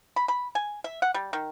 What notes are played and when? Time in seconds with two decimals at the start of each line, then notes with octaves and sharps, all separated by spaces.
0.16 B5
0.28 B5
0.55 G#5
0.84 E5
1.02 F#5
1.14 G3
1.33 D#3